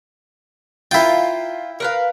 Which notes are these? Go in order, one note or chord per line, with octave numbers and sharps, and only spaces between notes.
E4 F4 A#4 G5
A#4 B4 F5